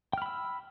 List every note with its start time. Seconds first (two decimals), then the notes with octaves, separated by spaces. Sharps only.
0.13 G5
0.18 F6
0.22 B5
0.26 E6